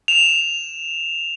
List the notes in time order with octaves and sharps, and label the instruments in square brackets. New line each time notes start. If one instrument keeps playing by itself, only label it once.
[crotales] E7 F7